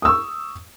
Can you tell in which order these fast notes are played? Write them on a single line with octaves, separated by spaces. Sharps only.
D#6 E6 C#6